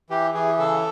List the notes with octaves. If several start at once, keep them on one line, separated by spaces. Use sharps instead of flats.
E3 G4
E3 G#4
C#3 A4